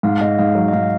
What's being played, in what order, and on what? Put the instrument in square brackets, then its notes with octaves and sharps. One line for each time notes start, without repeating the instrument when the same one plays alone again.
[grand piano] G#2 [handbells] F5
[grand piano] G#2 [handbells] D#5
[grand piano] G#2 [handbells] F5
[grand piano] F#3
[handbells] D#5
[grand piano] G#2 [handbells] F5